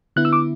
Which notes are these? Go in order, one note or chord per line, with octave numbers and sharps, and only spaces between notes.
D3 B3 E4 F#6
E6
D6